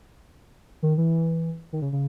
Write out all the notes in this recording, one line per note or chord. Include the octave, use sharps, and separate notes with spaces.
D#3
E3
D#3
C#3
C#3